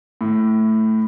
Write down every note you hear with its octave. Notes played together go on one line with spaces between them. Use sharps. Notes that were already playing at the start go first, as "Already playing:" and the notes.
A2